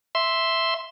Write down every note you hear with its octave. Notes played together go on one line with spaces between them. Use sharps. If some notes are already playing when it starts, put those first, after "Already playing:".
E5 C6